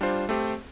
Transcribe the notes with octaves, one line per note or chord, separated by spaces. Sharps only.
G3 D4 F4 C5
A3 C4 G4 C5